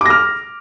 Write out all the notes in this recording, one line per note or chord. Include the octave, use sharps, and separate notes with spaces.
D6 F6 A#6